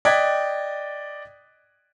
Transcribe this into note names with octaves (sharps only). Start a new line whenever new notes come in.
D5 D#5 G5 F#6 G#6 B6